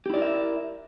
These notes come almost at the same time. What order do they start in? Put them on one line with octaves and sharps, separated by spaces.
G4 E4 D5 A#4 E5